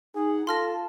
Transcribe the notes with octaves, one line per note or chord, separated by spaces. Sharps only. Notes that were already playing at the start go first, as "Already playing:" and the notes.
D#4 G#4 F#5
F4 A4 A5 C6 F6 A#6